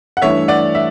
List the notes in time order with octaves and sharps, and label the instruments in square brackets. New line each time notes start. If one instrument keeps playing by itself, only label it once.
[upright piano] F#5
[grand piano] G2 E3 A3 D4 [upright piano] C#5 E5
[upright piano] D5 F#5
E5